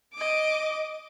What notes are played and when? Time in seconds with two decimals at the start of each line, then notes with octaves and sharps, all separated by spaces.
0.14 D#5 D6